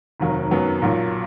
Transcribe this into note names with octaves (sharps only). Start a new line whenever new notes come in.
F1 D#2 D#3 F#3
F#2 D#3 F#3 B3
B1 A#2 F#3